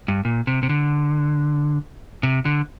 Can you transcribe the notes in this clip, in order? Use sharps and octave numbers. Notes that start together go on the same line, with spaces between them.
G2
A#2
C3
C3
D3
C3
D3